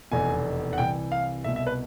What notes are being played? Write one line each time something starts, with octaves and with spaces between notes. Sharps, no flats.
F1 E2 B2 G#5
F#5
C2 C3 E3 G5
F5
C2 B2 E5
E5
B4